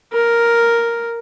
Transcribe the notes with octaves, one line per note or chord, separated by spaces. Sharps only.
A#4